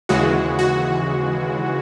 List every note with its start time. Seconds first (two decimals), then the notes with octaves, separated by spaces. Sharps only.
0.09 D#2 C#3 E3 G#3 F#4
0.59 F#4